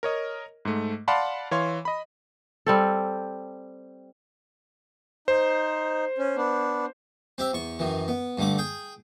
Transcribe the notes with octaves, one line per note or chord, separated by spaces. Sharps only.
A#4 C#5 D#5
G#2 A3
D5 F5 F#5 A5 B5 C6
E3 C#5 F5 C6
D#5 B5
G3 C4 A4
D#4 C5
C#4
B3 D4
C4 G4 E5
E2 C#6
F#2 D#3 E3
B3
G2 D3 A3 D6
G#4 G5